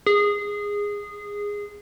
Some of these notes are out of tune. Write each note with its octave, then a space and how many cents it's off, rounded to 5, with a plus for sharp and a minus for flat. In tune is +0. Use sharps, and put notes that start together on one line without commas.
G#4 -15